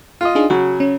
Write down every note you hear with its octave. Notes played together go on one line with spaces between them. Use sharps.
F4 D#5
D4 D#4 G#4
C#3 F#3 F#4
C#4